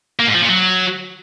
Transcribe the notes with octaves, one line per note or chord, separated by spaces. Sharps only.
A#3
G#2
F3
A#2
F#3